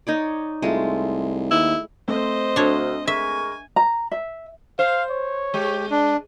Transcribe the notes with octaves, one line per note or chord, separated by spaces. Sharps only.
D#4 C#5 D5
C2 G#3 A3 F4
D#2 E4
A3 C4 C5 D#5
D2 D4 C#5
G#3 A#4 E5 G#5 C#6
A#5
E5
C5 F5
C#5
G#3 G4
D4